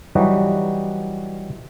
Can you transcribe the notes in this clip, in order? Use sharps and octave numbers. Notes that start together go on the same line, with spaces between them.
E3 F#3 G3 D#4 F#4